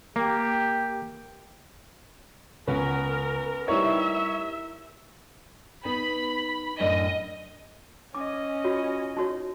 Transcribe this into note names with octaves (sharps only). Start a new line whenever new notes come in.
A#3 G4
C#2 B3 C#4 A#4 B4
G3 D#4 E4 A#4 C#5 E5
B3 D#4 B5
F#2 A2 D4 D#5
C#4 D#5 D6
F4 F#4 C#5
D#4 F#4 C#5